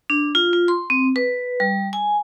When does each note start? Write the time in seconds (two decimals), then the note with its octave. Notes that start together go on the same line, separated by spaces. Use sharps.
0.10 D4
0.35 F4
0.53 F4
0.68 C6
0.90 C4
1.16 B4
1.60 G3
1.93 G#5